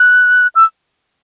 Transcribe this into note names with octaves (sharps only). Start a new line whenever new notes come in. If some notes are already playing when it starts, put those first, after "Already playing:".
Already playing: F#6
E6